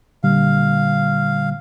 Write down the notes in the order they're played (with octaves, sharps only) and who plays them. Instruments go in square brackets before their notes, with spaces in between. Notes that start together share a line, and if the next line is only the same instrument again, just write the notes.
[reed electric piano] A#2 D3 G3 [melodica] F5